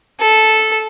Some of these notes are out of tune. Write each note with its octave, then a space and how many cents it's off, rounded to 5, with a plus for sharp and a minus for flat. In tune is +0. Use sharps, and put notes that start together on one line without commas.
A4 -10